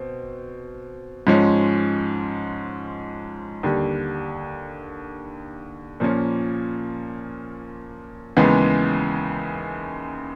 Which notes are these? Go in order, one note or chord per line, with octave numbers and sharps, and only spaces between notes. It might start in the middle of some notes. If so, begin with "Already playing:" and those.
Already playing: B2 C4
G#2 F3 G#3 C#4
D#2 D3 G3
A#2 F3 A#3 C#4
D#2 C#3 E3 G#3 B3